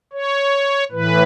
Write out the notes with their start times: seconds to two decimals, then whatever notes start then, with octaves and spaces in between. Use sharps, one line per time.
0.13 C#5
0.92 A2 E3 B4